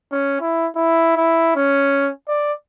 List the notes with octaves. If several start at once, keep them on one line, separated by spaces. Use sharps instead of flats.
C#4
E4
E4
E4
C#4
D5